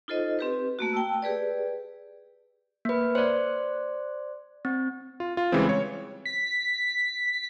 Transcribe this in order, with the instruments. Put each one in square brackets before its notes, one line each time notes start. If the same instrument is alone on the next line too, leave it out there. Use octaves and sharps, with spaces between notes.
[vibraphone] D#4 F4 A4 C5 D#5
C4 G4 B4
A3 A#3 F#4
G5 A5 E6
G4 G#4 B4 D5
[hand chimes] A#3 B4
C5 D5
C4
[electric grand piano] F4
F4
C#3 E3 G3 G#3 C4
C#5
[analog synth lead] B6